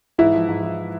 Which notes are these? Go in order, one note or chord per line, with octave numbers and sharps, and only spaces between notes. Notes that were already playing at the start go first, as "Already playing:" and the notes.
G#2 E3 E4
F3
G#2
F3